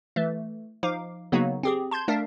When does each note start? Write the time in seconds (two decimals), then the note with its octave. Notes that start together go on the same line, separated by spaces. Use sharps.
0.16 E3 A3
0.83 F3 D#4 F5 D6
1.32 C#3 F#3 A#3 B3 D#4 F#4
1.63 C4 G4 G#4
1.91 A5 C6 G6 G#6
2.08 A3 D4 A#4 D5 E5 F5